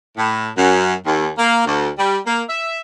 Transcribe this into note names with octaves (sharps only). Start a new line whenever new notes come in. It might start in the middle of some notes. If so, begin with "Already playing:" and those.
A2
F#2
D#2
A#3
D2
G3
A#3
E5